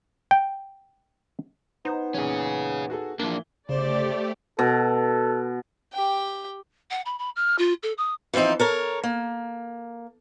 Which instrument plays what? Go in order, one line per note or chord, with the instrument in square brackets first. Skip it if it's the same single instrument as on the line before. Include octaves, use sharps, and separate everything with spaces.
[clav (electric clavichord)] G5
[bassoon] B3 [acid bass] D#4 [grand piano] C5
[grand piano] E2 A#2 [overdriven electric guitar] C#4 G#4
[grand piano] F#4 G#4 A4
[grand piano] E3 G7 [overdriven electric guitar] F3 A#3 [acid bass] D4
[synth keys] G1 C#3 [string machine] A3 G4 [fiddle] C5 [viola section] D5
[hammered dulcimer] B2 [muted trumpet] A4
[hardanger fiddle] G4 G5
[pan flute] F#5
B5
B5
F6
F4
A4
D#6
[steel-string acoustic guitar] E3 F3 G3 C4 D#4
A4 A#4 C#5
A#3